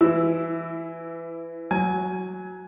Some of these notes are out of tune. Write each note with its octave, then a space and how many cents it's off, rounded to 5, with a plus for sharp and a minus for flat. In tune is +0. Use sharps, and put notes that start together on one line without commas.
E3 +20 E4 +0 E6 +0
F#3 +0 G#5 +15